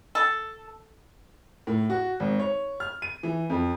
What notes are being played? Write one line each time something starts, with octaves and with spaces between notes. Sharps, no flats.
A4
A2
F#4
G#1
C#5
F6
D#7
E3
F2